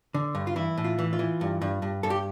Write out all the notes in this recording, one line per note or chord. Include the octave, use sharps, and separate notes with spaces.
D3
G2
F4
E3 E4
A2
F4
E3
F4
E3
G2
G2
G2
G2 A4
G4